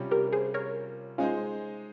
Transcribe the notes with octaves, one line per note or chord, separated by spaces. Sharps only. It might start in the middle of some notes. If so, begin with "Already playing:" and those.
Already playing: C3 G3 C#4 F4
G4 A#4
G#4 C5
A#4 C#5
G#3 C#4 D#4 F4 G#4 C5